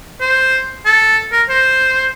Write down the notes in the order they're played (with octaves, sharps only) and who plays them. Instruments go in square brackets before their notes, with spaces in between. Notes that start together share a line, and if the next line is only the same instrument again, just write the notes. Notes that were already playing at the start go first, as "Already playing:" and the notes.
[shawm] C5
A4
A#4
C5